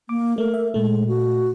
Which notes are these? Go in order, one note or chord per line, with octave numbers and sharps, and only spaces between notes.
A#3 D6
A3 A#4
E5
A#2 G#3 A3
F#4